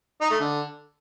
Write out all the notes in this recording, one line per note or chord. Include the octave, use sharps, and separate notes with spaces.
D#4
A3
D3